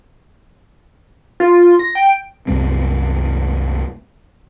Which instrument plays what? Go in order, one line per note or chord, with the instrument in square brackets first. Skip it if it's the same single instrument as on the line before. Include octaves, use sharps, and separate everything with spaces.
[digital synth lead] F4
A#6
G5
[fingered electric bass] C2 F#2 G3 C4